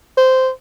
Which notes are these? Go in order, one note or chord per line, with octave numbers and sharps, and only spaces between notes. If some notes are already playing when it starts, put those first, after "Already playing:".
C5